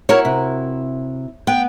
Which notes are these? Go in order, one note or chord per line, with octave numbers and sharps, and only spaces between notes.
E4 F#4 A#4 C#5
C3
B3 G5